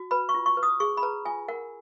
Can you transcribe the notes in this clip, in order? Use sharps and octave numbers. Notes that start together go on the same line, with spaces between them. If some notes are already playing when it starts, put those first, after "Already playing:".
Already playing: F#4
B4 B5
C#6
F4
C#6
B4
D#6
G#4 C#6
B5
B4 A#5
F4 G#5
A#4 F#5